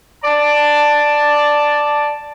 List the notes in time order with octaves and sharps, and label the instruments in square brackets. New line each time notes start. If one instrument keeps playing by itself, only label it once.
[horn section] D5 A5